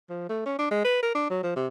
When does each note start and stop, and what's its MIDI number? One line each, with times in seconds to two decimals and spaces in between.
0.10 0.24 53
0.29 0.41 57
0.46 0.54 61
0.59 0.69 62
0.71 0.83 56
0.85 1.01 71
1.03 1.12 70
1.15 1.30 62
1.30 1.43 54
1.43 1.55 53
1.56 1.68 48